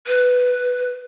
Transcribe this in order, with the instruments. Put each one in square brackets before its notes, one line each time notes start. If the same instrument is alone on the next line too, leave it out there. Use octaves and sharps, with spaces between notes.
[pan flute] B4